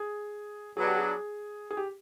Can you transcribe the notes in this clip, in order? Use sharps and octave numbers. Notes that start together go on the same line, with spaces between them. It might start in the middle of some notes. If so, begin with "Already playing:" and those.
Already playing: G#4
F#3 B3 D4 G#4
G4
G#4
G#4
G4